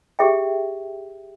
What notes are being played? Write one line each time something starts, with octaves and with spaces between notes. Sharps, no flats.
G4 G#4 E5 G5